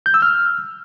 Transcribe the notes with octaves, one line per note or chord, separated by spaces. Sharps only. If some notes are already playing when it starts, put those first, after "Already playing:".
G6
E6
F6